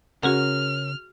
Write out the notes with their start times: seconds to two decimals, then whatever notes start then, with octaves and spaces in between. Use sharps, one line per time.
0.23 C#3 C#4 F#4 G#4 A#4 F#5 F6